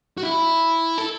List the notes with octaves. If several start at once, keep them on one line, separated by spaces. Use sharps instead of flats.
F#4
E4
A4